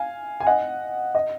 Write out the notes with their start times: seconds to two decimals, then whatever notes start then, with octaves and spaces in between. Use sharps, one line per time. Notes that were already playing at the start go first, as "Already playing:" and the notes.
Already playing: F5 G#5
0.40 G#5
0.47 D#5 F#5
1.15 D#5